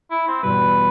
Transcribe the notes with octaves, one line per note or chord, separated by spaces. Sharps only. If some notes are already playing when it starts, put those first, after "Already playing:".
E4
C4
E2 B2 G3 B4